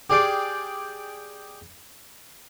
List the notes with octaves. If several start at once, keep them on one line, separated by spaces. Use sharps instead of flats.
G4 G#4 D5 F5 G5